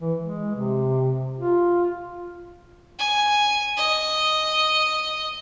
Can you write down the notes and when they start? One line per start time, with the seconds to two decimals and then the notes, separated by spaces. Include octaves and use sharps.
0.01 E3
0.21 G#3
0.55 C3
1.39 F4
2.99 G#5
3.77 D#5